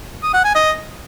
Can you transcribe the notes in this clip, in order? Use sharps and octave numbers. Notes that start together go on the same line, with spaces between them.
D#6
F#5
G#5
D#5